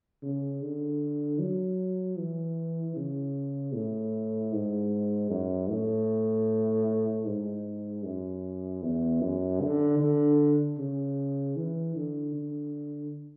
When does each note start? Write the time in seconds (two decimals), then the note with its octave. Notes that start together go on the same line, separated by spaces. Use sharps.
0.23 C#3
0.62 D3
1.40 F#3
2.19 E3
2.96 C#3
3.74 A2
4.53 G#2
5.30 F#2
5.69 A2
7.26 G#2
8.04 F#2
8.82 E2
9.21 F#2
9.61 D3
10.00 D3
10.78 C#3
11.56 E3
11.95 D3
12.35 D3